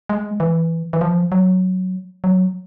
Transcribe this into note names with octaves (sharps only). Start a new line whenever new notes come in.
G#3
E3
E3
F3
F#3
F#3